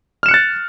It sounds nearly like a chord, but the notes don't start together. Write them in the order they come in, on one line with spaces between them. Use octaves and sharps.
F6 E7 C#7 F#6 A6